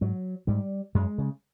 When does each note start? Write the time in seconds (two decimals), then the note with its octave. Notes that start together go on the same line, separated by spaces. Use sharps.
0.01 G#2 F#3
0.47 G#2 G3
0.95 F#2 G#3
1.18 C#3